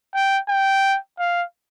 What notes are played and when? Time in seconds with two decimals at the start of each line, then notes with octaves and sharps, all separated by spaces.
0.15 G5
0.49 G5
1.19 F5